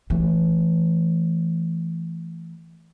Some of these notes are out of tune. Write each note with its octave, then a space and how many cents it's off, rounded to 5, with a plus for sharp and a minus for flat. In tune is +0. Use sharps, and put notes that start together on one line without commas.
E3 +20 A3 -5